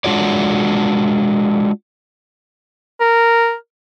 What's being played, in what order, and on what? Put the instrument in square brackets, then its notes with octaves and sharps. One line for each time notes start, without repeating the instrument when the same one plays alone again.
[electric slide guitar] G#3 D4 F4 F#4 C#5 D5
[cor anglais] A#4